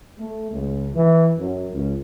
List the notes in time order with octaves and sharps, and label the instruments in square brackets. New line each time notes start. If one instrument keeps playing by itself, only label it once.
[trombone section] A3
C#2
E3
F#2
C#2